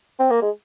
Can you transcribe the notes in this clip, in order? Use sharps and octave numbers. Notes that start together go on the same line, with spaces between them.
C4
A#3
G#3